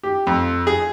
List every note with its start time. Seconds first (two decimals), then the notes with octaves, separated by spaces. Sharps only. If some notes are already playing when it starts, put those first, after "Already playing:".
0.03 G4
0.27 F2
0.67 G#4